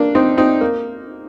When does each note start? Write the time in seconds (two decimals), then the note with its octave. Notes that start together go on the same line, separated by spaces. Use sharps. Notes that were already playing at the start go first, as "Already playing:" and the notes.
Already playing: A#3 D4
0.15 C4 D#4
0.37 C4 D#4
0.61 A#3